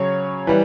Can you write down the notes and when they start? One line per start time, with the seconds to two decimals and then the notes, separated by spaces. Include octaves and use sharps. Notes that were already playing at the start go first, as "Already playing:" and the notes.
Already playing: C#3 F#3 C#4 C#5
0.47 E3 G3 B4